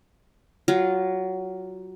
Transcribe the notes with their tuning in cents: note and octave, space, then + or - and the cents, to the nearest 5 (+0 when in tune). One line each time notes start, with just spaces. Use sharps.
F#3 +15 F4 +0